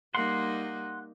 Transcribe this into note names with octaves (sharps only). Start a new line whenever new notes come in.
G3 A#3 D#4 F#5 C6